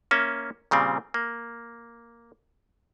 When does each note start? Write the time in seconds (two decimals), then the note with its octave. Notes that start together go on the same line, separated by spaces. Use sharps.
0.11 A#3 C#4 E5
0.71 A#2 C#3 G3 C4
1.14 A#3